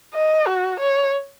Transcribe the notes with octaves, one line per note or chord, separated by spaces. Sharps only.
D#5
F#4
C#5